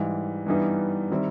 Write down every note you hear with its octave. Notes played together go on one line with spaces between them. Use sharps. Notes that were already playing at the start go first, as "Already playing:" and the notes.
Already playing: G#2 E3 G3
G2 E3 G3 B3 D#4
D#3 G3 C4 E4